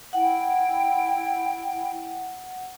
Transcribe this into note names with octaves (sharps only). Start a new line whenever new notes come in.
E4 F#5 G5